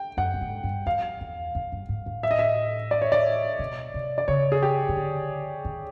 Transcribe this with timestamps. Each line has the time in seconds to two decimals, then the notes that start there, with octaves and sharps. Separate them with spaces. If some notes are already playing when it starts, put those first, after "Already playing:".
Already playing: G5
0.17 F#2 F#5
0.34 A2
0.41 G#2
0.64 G2
0.86 F2 F5
1.21 E2
1.55 F2
1.72 G2
1.89 G#2
2.06 A2
2.23 E5
2.31 D#5
2.39 E5
2.91 D5
3.02 C#5
3.12 D5
3.59 B2
3.94 C3
4.18 D5
4.28 C#3 C#5
4.52 G#4
4.63 G4
4.89 C#3
4.97 D3
5.65 D#3